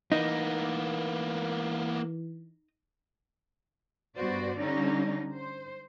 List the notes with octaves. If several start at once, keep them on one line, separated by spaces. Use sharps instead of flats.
E3 A#3 B3 D#4
G2 B3 F#4 C5 D5
D3 G3 C#4 D#4
C5